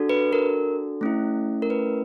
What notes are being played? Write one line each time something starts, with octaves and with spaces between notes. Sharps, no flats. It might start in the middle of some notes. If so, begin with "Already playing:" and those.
Already playing: D4 F#4 A4
B4
A#4
A3 C#4 E4
A#4
B4